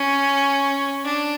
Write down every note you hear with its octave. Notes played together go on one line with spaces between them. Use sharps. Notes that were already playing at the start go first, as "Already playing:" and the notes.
Already playing: C#4
D4